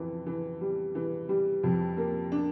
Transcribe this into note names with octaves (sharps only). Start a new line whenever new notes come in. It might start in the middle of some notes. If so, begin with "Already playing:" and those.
Already playing: F2 E3
E3
G3
E3
G3
F2
A#3
D4